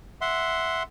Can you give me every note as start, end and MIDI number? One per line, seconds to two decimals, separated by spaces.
0.21 0.83 76
0.21 0.83 78
0.21 0.83 84